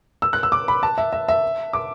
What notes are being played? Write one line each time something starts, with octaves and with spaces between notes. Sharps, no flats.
E6
F#6
E6
D6
B5
A5
E5
E5
E5
D6